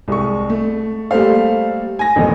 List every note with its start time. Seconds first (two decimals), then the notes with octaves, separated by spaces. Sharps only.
0.08 C2 G#3 C#6
0.50 A3
1.11 G3 A3 A#3 A4 C5 F5
1.99 G#5 A#6
2.16 A1 F2 B2 D#3 D#5